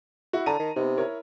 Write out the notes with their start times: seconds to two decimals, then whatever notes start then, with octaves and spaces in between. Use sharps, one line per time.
0.33 E4 F#4
0.46 D3 A5 A#5 D#7
0.59 D#3
0.76 C3 B3 D#4
0.98 E4 A#4 C#5